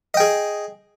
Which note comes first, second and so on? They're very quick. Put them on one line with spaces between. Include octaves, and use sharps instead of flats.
D#5 G5 G#4